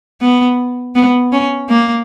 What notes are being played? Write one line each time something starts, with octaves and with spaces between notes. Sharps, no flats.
B3
B3
C#4
A#3